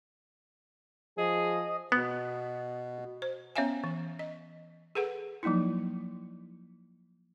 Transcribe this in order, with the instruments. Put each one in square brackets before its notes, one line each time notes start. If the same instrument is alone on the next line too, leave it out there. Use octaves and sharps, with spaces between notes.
[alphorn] F3 [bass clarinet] G#4 [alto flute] D#5
[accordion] B2 [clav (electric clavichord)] B3
[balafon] C5
B3 C#4 C#5 E5 F5 G#5
E3
D#5
G#4 A4 B4 F#5
F3 F#3 A#3 D#4 E4